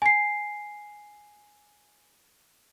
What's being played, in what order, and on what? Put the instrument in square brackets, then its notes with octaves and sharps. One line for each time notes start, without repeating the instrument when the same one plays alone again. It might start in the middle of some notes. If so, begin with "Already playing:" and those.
[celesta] G#5 C7